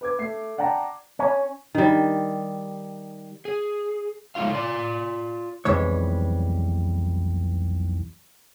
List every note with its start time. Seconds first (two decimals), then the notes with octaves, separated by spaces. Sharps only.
0.01 B4 D6 G#6
0.19 A3 C7
0.58 D5 F#5 G5 A5 A#5
1.19 C#4
1.75 D#3 G3
3.45 G#4
4.35 G#3 A3 D#4 F4 F5
4.50 F4 D5
5.65 B1 F2 E3 G3 G#3 C#5